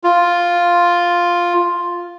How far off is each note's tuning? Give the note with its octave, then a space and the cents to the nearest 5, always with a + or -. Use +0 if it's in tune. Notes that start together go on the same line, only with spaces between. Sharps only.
F4 +0